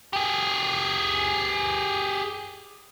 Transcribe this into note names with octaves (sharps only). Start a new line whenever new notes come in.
G4 G#4